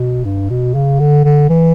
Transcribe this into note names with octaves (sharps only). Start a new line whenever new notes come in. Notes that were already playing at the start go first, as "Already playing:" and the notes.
Already playing: B2
G2
B2
C#3
D3
D3
E3